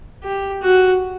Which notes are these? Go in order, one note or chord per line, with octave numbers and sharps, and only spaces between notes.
G4
F#4